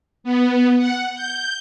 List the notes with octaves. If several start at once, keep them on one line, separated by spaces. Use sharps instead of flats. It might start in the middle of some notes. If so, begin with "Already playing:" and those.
B3
F#5
G6